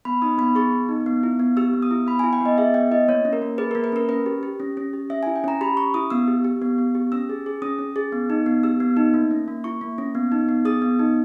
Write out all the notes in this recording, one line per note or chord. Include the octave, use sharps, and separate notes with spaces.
B3 B5
D#4 D#6
B3 B5
G#4 C#6
B3
D#4
B3
E4
B3
G4 E6
B3
D#6
E4
B3 B5
G#5
E4
G5
B3 D#5
G#4 E5
B3 G5
E4 D#5
A#3 C#5
C#4
A#4
A#3
G#4 B4
A#4
A#3
B4
C#4 A#4
C#4 B4
G4
G4
C#4
C#4
G4
C#4 E5
G#5
E4
G5
C#4 A#5
G4 B5
C#4 C#6
E4 D#6
B3 E6
G4
G4
B3
B3
G4
C#4 E6
G#4
G#4
C#4 D#6
C#4
G#4
B3
D#4
B3
G4 E6
B3
D#4
A#3
C#4
A#3
E4 C#6
A#3
C#4
B3
D#4
B3
G#4 D#6
B3
D#4